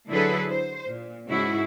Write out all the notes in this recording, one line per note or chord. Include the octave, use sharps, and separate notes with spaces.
D3 F#3 E4 G#4 A4 B4
C5
A#2
G#2 C#3 E4 F#4 G#4